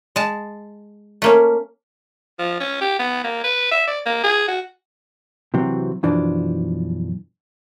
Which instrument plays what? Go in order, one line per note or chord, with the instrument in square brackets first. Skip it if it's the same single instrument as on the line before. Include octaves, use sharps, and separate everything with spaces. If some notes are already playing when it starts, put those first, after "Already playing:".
[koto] G#3 A5
A3 A#3 C#4
[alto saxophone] F3
C#4
G4
B3
A#3
B4
E5
D5
A#3
G#4
F#4
[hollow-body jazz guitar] C3 E3 F#3 C4
B1 F#2 E3 F3 D4